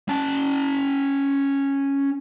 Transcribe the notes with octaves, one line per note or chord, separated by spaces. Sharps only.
C#4 A5